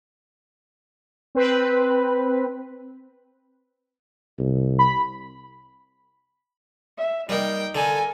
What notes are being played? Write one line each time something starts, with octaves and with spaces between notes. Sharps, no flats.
C4 B4
C2
B5
E5
G3 A#3 D#4 G5
D3 A4 A#4 G#5